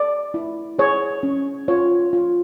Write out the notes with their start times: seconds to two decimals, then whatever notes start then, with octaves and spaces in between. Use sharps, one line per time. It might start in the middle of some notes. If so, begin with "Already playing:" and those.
Already playing: A4 D5
0.34 E4
0.79 G#4 C#5
1.23 C#4
1.68 F4 C#5
2.13 F4